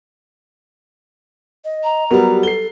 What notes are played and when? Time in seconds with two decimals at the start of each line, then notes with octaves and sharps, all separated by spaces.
1.65 D#5
1.84 A#5
2.11 F#3 G3 B3 G4 A#4
2.43 A4 C7 G7